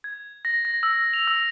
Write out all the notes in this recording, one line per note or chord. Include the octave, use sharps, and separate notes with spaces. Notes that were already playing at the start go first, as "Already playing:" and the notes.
G#6
A#6
A#6
E6
F7
E6